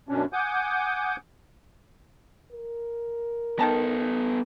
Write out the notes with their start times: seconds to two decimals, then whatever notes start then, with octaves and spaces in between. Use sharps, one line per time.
0.09 F#2 B2 C#4 D4
0.33 F#5 G#5 D6 D#6 G6
2.52 A#4
3.59 D#3 B3 A4 A5 A#5